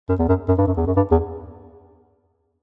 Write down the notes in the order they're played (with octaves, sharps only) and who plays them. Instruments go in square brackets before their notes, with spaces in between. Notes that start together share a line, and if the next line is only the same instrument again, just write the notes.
[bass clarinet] F#2
E2
F#2
F#2
G2
F#2
E2
F#2
G2
E2